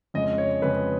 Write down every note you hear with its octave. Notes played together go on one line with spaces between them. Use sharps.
F2 C#3 G#3 D#5
C#5
F2 C#3 G#3 B4